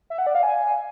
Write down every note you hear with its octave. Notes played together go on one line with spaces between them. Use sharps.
E5
F#5
D5
F5
G#5